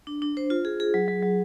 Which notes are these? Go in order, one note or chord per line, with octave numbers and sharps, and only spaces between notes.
D4
D4
C5
F4
G#4
G#4
F#3
F#3
F#3